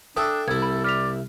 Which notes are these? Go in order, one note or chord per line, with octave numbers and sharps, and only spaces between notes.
D4 A4 E5 G5 D#6 E6
C2 E4 A4 G#6
B5
D5 F6 B6 F7